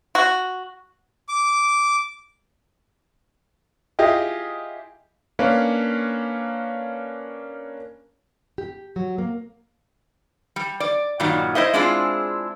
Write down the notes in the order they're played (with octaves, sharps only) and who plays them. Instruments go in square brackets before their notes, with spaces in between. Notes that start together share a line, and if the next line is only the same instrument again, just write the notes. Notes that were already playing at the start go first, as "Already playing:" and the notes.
[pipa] F#4
[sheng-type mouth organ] D6
[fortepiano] E4 F4 G4 G#4 D#5
[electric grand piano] A#3 C#4 D4 B4 C#5 F5
[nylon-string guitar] G4
F#3
A#3
[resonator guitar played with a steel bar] G3
D5
G2 A#2 D#3 F#3 G3
E4 C5 D#5 E5
G#3 C4 D4 E4 F4 G#4